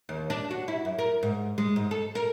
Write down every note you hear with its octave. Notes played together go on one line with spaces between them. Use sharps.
D#2
D4
F#4
E4
F#2
A#4
G#2
G#3
G#2
A4
A#4